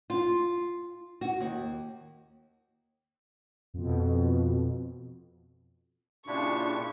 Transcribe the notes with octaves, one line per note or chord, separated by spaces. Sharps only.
F4
F#4
D#2
F2 B2
A#2 C#3 D4 E4 F4 G4 C#6